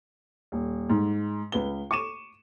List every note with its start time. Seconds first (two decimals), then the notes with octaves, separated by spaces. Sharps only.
0.52 D#1
0.90 G#2
1.52 C#2 B4 G7
1.91 C#6 D6 D#7 E7